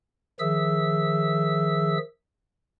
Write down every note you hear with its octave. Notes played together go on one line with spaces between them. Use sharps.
D#3 F3 G#4 E5 E6